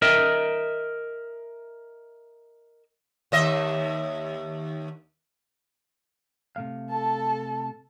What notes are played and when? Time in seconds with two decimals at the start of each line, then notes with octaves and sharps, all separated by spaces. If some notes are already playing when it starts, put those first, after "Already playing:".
0.02 A#4 D#5 E5
3.32 D#2 D#5 E5
6.56 C3 A3 F5
6.90 A4 A5